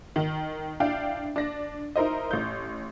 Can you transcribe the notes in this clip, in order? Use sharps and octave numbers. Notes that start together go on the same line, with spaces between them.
D#3
D4 E4 F5 G5
D4 A#6
D#4 E4 A#4 C5 D#5
A1 G6